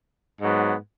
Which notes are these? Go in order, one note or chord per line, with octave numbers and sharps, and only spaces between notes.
G#2 F#3 B3